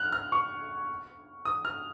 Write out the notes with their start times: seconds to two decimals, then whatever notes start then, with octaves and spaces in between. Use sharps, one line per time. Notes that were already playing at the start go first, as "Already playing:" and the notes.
Already playing: F6 F#6
0.12 F6
0.32 C#6
1.45 D#6
1.65 F6